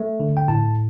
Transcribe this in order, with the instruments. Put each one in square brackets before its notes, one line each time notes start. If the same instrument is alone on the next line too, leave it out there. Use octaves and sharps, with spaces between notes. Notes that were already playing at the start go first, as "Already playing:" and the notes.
Already playing: [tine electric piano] A3
D3
G5
A2 A5